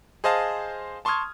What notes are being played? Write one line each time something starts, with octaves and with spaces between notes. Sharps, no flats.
G#4 C5 D#5 F5 A5
A5 C6 C#6 D#6 F6 G#6